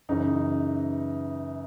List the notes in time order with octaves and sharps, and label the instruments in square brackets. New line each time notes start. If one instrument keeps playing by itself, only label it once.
[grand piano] F#2 C#3 E3 D#4